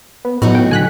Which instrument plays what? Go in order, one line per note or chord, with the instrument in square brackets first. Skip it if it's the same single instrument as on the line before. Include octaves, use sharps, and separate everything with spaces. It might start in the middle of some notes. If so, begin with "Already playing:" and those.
[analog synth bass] B3
[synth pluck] A2 [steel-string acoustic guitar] F#3 D#4 F#4 [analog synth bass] B3
[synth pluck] G5
[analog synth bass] D3 [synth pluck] G#5 F#6 B6